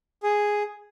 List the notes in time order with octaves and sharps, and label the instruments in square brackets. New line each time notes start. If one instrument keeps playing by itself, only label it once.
[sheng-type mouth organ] G#4